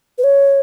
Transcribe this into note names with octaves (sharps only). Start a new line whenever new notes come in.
B4
C#5